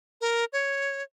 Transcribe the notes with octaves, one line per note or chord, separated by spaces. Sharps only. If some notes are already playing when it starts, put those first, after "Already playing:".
A#4
C#5